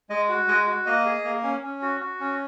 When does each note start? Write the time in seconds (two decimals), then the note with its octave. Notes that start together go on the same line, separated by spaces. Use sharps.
0.10 G#3 D#5
0.29 F#4
0.48 G#3 D#5
0.67 F#4
0.86 A#3 D#5
1.06 G#4
1.24 A#3
1.43 C#4
1.63 C#4
1.82 F#4
2.01 F#4
2.20 C#4